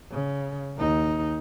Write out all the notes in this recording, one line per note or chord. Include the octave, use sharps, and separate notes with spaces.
C#3
D#2 D#4